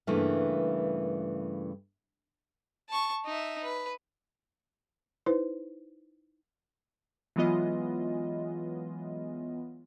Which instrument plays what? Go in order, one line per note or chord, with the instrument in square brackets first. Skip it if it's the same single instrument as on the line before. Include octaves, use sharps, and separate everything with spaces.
[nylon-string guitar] G2 C#3 E3 A3 A#3
[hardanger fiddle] A5 C#6
D#4 E5
B4
[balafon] D#4 E4 B4 C5
[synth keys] E3 F#3 G#3 B3 F4 D#5